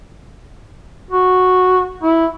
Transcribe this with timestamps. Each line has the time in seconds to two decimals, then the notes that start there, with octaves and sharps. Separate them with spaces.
1.11 F#4
2.03 E4